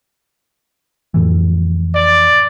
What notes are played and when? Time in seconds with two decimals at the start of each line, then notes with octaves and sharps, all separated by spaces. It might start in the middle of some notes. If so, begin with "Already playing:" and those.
1.14 F2 A2 E3
1.94 D5